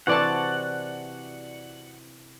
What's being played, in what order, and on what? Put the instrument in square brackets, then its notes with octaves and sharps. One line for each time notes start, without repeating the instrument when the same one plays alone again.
[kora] C3 E3 C4 [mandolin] F#4 D5 A5 [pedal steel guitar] F#5